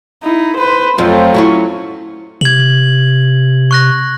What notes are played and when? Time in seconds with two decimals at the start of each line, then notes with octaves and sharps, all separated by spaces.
0.23 D#4 E4
0.58 B4 C5 C6
0.98 F2 F3 F#3 A3 F4
1.34 C#4 E4 F#4
2.41 C3 G#6 F#7
3.71 C#6 F#6 A#6